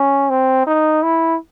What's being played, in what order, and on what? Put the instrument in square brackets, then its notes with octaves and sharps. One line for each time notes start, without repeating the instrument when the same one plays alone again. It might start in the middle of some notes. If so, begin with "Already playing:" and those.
Already playing: [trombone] C#4
C4
D#4
E4